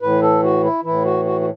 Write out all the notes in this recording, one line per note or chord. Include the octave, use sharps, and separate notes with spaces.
A2 E3 B4
A4
F#4
E4
A2 E3 E4
F#4
F#4
F#4